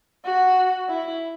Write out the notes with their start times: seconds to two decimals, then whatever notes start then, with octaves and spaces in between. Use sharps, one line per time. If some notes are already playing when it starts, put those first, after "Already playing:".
0.24 F#4
0.89 E4